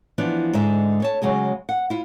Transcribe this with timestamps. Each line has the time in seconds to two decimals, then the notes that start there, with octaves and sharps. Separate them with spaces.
0.18 E3 F3 B3 D4
0.53 G#2 D3 G#3 E5
1.00 A4 C#5 A5
1.22 C#3 F#3 G#3 G#4
1.69 F#5
1.90 E4 F4